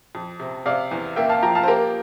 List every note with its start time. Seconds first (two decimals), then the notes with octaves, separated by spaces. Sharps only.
0.15 F2
0.39 C3
0.66 C3 D5 F5
0.91 E2
1.16 A#3 E5 G5
1.29 F5 A5
1.43 F3 G5 A#5
1.55 F5 A5
1.63 C5
1.68 A#3 G4 A#4